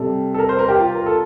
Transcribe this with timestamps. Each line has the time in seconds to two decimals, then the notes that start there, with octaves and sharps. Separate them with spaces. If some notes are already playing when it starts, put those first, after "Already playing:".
Already playing: C3 G3 A4
0.34 A4
0.39 A#4
0.49 C5
0.59 A#4
0.69 G4
0.79 F4
0.94 A#4
1.06 A4